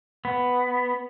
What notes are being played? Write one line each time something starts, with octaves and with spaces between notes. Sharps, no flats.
B3